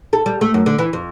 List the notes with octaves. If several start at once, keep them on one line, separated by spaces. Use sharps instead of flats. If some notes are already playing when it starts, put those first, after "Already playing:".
A4
G3
A3
F#2
D3
E3
F2